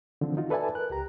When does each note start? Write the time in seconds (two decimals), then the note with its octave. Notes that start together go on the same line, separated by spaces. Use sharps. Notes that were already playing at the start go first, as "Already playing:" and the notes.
0.21 D3 D#3 F3 C4
0.37 D#4 F4 F#4
0.50 A4 B4 D5 E5 G#5 A5
0.75 A#4 B4 F#6
0.90 C#2 G4 A#5